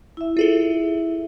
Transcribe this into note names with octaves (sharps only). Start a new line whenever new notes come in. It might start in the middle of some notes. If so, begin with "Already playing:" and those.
E4 E5
F4 G#4 A4